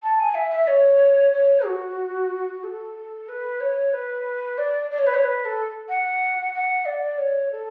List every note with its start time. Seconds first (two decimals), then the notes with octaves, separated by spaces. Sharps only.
0.03 A5
0.19 G#5
0.34 E5
0.51 E5
0.67 C#5
1.33 C#5
1.65 F#4
2.63 A4
3.28 B4
3.60 C#5
3.93 B4
4.58 D5
4.91 D5
4.98 C#5
5.06 B4
5.14 C#5
5.23 B4
5.45 A4
5.88 F#5
6.53 F#5
6.85 D5
7.18 C#5
7.51 A4